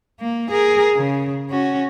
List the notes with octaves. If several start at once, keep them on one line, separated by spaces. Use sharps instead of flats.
A#3
G#4 A#4
C#3
C#4 F#4